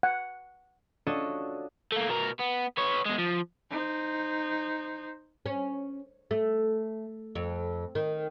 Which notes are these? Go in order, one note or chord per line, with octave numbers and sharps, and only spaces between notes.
F#5
D4 F4 F#4 A4 C#5 D#5
A3 A#3
B2 A#4
B3
B3 C#5
B2 G#3
F3
D#4 C5
C#4
A3
F2
D#3